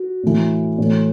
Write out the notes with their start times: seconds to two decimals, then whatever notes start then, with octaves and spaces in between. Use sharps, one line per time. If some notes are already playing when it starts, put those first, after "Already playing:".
Already playing: F#4
0.23 A2 E3
0.78 A2 E3